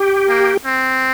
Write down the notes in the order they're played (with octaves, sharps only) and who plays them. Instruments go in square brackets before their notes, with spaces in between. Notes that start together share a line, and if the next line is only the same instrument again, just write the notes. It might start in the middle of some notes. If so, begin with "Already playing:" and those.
Already playing: [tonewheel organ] G4
[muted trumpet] A#3
C4